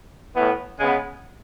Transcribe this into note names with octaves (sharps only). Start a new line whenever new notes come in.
A2 E3 B3
C#3 G#3 B3